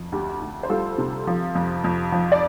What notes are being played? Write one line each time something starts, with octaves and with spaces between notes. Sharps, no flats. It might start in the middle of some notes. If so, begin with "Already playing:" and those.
Already playing: F2
D2 G4
D2
C5
G3 F4 A4
C3
F3
F2
F2
F3
D5